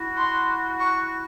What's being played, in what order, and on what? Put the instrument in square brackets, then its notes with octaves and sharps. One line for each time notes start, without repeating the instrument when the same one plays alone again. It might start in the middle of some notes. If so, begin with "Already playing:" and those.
Already playing: [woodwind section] E4 F#4
[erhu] C6
C#6